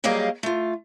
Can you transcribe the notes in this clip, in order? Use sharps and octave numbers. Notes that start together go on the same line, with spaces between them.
F#3 G3 A#3 G#4 D#5 F5
A3 F4